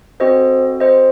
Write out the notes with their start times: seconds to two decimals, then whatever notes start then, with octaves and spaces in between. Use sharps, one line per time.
0.20 C4 F#4 A4 C5 D#5
0.80 C5 D#5